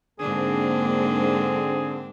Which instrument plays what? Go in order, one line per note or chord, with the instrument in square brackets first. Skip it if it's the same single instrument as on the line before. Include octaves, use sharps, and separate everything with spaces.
[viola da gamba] G#2 D4 [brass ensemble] D3 C4 [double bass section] A#3 [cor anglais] G#4